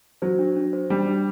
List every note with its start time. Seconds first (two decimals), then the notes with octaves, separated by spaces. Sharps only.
0.22 F#3 C5
0.39 D4
0.56 D4
0.73 C5
0.90 G3 D4
1.08 D4